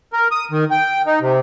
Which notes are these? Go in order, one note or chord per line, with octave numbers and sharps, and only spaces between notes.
A#4
D#6
D#3
G5
D#4
C3